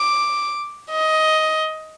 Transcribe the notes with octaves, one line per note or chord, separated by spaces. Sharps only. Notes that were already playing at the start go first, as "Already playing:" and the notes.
Already playing: D6
D#5